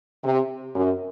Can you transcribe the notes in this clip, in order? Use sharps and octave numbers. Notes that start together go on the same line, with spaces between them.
C3
F#2